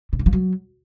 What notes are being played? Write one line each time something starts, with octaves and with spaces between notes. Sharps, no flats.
C3
D3
F3
F#3